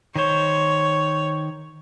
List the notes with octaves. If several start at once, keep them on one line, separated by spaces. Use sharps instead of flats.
D#3 C5 C#5